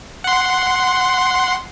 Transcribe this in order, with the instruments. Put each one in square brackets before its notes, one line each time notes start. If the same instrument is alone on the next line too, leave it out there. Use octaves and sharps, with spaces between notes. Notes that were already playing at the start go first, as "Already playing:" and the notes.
[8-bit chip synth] F#5 C6